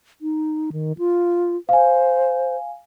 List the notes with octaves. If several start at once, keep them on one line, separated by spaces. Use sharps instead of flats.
D#4
D#3
F4
C5 F5 G#5